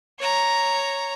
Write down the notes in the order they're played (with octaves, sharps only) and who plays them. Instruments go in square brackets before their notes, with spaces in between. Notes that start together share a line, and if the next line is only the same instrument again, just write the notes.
[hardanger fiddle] C#5 A#5